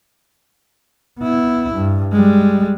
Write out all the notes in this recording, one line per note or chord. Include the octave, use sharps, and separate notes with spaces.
B3 E4
G2
G3 G#3